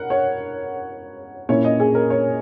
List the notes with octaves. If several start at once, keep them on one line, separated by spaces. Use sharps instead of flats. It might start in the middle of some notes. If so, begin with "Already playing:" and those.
Already playing: A#4 F#5
C#5
A#2 A#3 C#4 E4 C#5
D#5
G#4
A#4
C#5